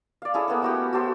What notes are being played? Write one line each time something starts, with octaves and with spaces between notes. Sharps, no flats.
D5 F5
C#4 E4 G#4 A4
A#3 B3 C#4 A4
A3 F#4 G4
F#4 G4 A4 C5